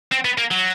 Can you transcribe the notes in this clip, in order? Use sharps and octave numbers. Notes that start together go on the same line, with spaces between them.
C4
B3
A#3
F#3